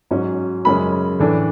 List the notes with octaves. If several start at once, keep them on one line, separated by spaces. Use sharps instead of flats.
G#2 F#3 C#4
F#2 C#3 G#3 C#4 B5
A2 E3 A3 D4